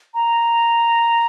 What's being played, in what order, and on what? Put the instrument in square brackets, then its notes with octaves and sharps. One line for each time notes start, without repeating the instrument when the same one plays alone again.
[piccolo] A#5